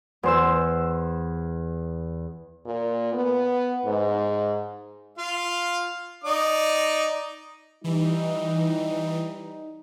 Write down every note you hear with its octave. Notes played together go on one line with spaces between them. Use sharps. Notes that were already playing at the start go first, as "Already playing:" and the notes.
E2 C5 E6
A#2
B3
G#2
F4 F5
D#4 D5 D#6
E3 G3 D#4